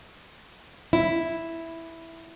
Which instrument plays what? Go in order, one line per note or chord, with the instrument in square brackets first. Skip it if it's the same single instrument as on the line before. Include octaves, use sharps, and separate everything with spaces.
[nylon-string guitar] E4